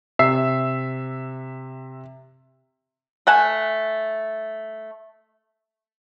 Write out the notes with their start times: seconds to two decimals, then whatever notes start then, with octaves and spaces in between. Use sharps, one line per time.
0.19 C3 E5 E6 C7
3.27 A3 F#5 G#5 A5